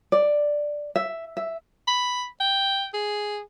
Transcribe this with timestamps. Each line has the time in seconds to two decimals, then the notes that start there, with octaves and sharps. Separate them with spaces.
0.12 D5
0.96 E5
1.37 E5
1.87 B5
2.40 G5
2.94 G#4